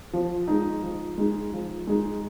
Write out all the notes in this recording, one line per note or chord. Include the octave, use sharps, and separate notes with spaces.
F3
G#3 D#4
F3
G#3 D#4
F3
G#3 D#4